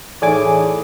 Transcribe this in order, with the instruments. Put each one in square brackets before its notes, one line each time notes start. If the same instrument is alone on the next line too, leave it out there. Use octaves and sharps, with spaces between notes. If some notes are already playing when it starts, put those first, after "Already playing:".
[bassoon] A2 [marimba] E3 D#4 [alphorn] G#4 [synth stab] D5 G#5 D6